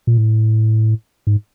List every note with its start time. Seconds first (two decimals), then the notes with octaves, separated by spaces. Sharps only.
0.07 A#2
0.18 A2
1.27 G#2